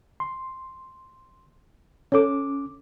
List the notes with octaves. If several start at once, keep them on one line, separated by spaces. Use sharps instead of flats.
C6
C#4 A4 C#5 D6